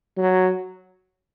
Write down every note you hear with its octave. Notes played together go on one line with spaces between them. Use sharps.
F#3